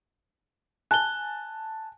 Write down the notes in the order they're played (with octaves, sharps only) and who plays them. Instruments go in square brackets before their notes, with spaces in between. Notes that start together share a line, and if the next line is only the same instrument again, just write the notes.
[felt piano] G#5 A5 [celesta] F#6 G7